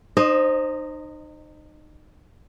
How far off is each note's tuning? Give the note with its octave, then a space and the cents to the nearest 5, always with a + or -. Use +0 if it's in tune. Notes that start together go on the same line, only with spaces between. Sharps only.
D#4 -30 C5 +10 D#5 +0